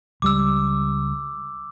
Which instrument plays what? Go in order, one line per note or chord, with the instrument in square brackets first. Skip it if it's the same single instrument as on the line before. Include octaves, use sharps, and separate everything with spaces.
[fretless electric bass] C#2 G3 [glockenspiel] D6 E6